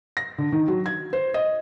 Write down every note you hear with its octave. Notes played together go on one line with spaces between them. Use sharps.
A#6
D3
D#3
F#3
G#6
C5
D#5